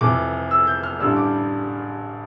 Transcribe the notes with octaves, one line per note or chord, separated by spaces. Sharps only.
F1 F2 E3 D6
E6
G6
F6
A1 G2 D3 G3 E6
D6